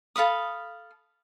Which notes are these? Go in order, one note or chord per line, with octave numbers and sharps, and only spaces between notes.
A4 F5 B5 D#6